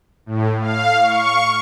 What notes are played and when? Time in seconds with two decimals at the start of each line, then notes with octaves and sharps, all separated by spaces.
0.26 A2
0.61 F5
1.01 C#6